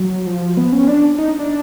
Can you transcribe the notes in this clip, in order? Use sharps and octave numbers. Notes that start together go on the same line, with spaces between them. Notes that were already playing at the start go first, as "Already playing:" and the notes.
Already playing: F#3
F3
B3
C#4
D4
D#4
D4